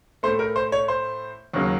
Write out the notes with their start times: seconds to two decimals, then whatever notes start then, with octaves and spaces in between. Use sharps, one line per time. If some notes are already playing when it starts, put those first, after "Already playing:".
0.23 A2 A3 C5
0.39 A#4
0.56 C5
0.72 C#5
0.88 C5
1.54 D#2 C#3 F#3 A#3